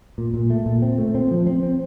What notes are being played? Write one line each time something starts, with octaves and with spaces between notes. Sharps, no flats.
A#2
A#2
A3
A#2
C4
A3
C4
F3
C4
C4